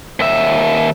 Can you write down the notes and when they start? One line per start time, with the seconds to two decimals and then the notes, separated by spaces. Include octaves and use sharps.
0.20 D#2 E5